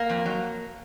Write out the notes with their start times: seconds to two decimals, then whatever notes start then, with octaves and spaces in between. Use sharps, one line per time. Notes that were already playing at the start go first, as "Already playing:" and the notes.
Already playing: A#3
0.09 F2
0.26 F#3